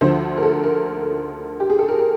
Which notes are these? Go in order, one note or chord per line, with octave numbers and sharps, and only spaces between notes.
D2 D3 F3 C5
A#4
A4
A#4
G4
G#4
A4
A#4
A#4